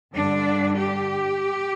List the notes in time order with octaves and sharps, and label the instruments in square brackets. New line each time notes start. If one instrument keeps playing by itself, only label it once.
[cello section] G2 D3 G3 D4
G4